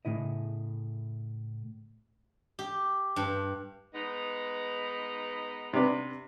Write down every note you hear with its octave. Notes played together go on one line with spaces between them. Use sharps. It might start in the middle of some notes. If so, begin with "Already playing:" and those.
A2 C#3 E4 D#5
G4
G2
G#3 B3 D#4
C3 D4 B4